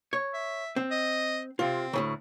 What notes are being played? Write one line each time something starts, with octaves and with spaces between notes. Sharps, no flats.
C#5
E5
C4
D#5
C3 C4 F4
D2 A2 C#3